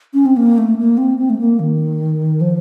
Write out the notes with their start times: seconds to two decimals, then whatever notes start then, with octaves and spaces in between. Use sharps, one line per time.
0.14 C#4
0.26 C4
0.37 A#3
0.58 A3
0.78 A#3
0.98 C4
1.18 C4
1.30 A3
1.39 A#3
1.60 D#3
2.41 F3